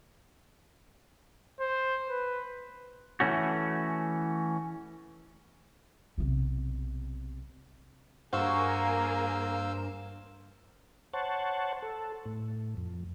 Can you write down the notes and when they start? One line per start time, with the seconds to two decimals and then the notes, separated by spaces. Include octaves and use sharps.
1.60 C5
2.10 B4
3.20 E3 A3 C#4 F#4
6.18 B1 C3
8.33 G2 A#3 F#4 G#4 C5 F5 E6
11.13 C5 C#5 F#5 A5
11.83 A4
12.25 A2
12.77 F2